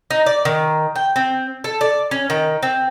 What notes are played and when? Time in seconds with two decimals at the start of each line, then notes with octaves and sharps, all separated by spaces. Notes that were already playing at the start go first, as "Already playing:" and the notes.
0.11 D#4
0.26 D5
0.45 D#3
0.95 G5
1.16 C4
1.64 A4
1.81 D5
2.11 C#4
2.30 D#3
2.63 C4